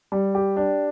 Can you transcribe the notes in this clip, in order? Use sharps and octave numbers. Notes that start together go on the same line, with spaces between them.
G3
G4
D4